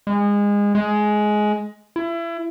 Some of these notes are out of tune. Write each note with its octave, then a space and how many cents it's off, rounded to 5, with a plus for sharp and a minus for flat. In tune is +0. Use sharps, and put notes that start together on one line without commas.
G#3 -25
G#3 +15
E4 +30